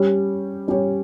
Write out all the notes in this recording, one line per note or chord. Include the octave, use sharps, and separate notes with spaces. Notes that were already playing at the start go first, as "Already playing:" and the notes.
Already playing: G3 C#4 G4 C#5
G3 C#4 G4 C#5